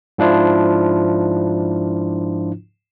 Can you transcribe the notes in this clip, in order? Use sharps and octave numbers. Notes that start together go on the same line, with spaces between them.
G#2 F3 D4 E4 F4